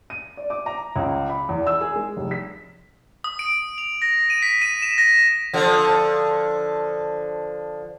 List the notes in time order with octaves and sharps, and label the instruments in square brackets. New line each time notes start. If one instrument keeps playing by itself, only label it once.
[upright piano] D#7
D5
D6
A#5
C#2
B5
E2
E6
G#4
G#3
F1
B6
[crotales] D#6
D7
F7
A#6
D#7
B6
D#7
E7
A#6
[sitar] D3 F3